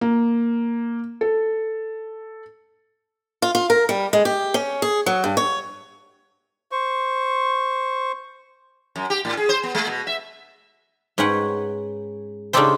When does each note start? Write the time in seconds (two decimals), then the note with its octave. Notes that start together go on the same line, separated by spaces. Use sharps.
0.01 A#3
1.21 A4
3.42 F4
3.55 F4
3.70 A#4
3.89 G3
4.13 G#3
4.25 G4
4.54 C#4
4.82 G#4
5.06 F#3
5.24 G2
5.37 C#5
6.72 C5 C#6
8.96 F#2
9.10 G4
9.25 A2
9.37 G#4
9.49 C5
9.63 B3
9.75 G#3
9.88 B2
10.07 E5
11.18 G#2 C#4 B4 C#5 F#5 G5
12.53 C#3 D4 D#4 G4 A4 C5